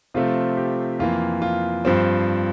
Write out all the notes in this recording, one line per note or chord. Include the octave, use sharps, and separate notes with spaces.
C3 F3 A3 C4 F4
G4
F2 E3 A#3 F4
F4
G2 F3 C4